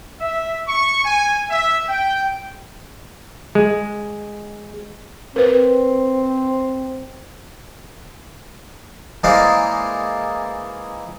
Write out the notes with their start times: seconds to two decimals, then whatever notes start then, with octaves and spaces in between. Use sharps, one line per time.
0.20 E5
0.67 C#6
1.04 G#5
1.50 E5
1.88 G5
3.55 G#3
5.36 C4 A#4 B4
9.24 E3 G#3 A#3 G#4 C5 D5